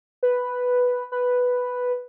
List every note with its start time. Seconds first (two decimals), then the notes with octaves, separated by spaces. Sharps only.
0.23 B4
1.12 B4